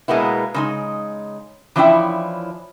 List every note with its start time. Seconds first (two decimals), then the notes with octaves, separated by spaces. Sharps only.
0.08 B2 G#3 A#3 B3 E4
0.54 C#3 G#3 D#4
1.76 E3 F3 C#4 D4 E4 G5